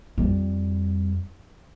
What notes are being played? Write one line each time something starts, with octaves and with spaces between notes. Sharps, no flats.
F2 G3